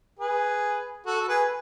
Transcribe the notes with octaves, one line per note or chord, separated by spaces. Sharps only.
G#4 B4
F#4 A4
A4
G#4 B4